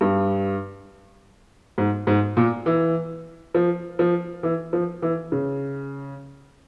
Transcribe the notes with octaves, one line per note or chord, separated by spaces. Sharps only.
G2
G#2
G#2
A#2
E3
F3
F3
E3
F3
E3
C#3